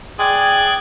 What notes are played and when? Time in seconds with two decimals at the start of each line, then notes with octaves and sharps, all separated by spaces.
0.19 G#4 D5 G5 F#6 G#6